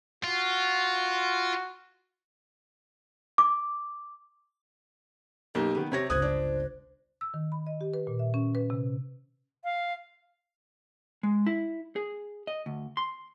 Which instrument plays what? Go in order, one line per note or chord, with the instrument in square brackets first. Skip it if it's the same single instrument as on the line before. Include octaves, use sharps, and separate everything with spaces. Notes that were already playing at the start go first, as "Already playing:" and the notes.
[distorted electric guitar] F4 [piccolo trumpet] F#4
[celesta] D6
[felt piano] B1 A#3 D#4 [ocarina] G4
[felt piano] D#3 B3
[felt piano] C3 C#5 A#6 [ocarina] G4
[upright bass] G1 C#2 [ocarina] C5 [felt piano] D#6 F#6 G#6
[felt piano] D4
[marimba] E6
D#3
B5
D#5
G4
B4
A#2
E5
C#4
B4
C3
[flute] F5
[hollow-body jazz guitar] G#3
E4
G#4
D#5
D2
C6